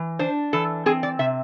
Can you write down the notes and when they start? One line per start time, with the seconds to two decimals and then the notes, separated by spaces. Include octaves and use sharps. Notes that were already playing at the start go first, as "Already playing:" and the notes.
Already playing: E3
0.19 D4 C5
0.53 E3 A4
0.86 C4 G#4
1.03 D5
1.19 C3 E5